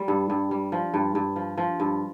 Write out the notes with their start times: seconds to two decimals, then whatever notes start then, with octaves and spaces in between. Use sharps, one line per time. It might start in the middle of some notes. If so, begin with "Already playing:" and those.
Already playing: G3
0.08 G2
0.30 G2
0.51 G3
0.72 F3
0.94 G2
1.15 G2
1.36 F3
1.58 F3
1.80 G2